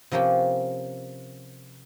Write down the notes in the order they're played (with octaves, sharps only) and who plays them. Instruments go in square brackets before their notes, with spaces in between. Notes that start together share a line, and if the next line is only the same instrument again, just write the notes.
[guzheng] C3 F3 A#3 C#4 G4